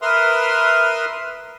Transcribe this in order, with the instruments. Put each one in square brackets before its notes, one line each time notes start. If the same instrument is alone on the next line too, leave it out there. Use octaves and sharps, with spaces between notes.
[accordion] A#4 B4 E5 C6 D#6 F6